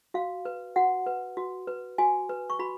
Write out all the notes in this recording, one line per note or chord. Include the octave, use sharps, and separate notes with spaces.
F#4 F5
B4
F#4 F#5
B4
F#4
B4
F#4 G#5
B4
C#6
F#4 B5